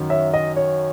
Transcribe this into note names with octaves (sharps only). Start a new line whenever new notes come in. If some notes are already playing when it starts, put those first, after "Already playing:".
Already playing: F#2 D#3 F#3
C#5 E5
D#5
C#5